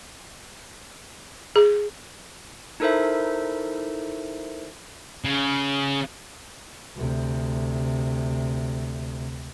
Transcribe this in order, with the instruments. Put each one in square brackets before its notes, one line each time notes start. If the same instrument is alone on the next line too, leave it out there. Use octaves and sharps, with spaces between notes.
[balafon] G#4
[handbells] D#4 E4 A4 A#4 C5 E5
[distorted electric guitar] C#3
[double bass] D2 C3